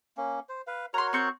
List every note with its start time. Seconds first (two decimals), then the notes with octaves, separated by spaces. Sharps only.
0.17 A#3 C#4
0.49 C5
0.67 B4 F5
0.94 F#4 A#4 C#5 A#5 C6
1.13 C4 C#6 G6